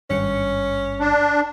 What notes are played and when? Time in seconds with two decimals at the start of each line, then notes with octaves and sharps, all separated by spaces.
0.10 G#1 G2 C#4 C#7
1.00 D4